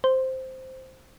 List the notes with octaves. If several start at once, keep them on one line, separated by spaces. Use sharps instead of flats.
C5